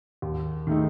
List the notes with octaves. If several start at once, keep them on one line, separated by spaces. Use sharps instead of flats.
D#2
D#3 A3 D#4